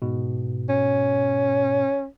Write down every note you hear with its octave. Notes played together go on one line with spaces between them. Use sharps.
G#2 B2
C#4